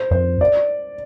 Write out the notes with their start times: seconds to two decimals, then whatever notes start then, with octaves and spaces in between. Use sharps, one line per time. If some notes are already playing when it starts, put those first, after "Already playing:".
Already playing: C5
0.11 F2 C5
0.41 D5